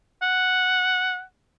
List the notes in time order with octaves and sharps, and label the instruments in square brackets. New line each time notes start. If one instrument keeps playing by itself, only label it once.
[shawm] F#5